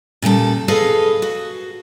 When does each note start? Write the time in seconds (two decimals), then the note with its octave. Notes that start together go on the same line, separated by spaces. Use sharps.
0.22 A#2 C#3 G3 A4
0.68 G#4 A4 B4 D#5 F5
1.22 F#4